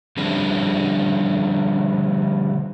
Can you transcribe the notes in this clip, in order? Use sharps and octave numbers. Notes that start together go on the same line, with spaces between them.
D3 F3 G3 C#4 D4 A4